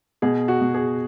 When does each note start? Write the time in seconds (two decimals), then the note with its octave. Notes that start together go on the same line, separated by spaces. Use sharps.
0.22 B2 G#4
0.48 F#4
0.61 B2
0.74 G#4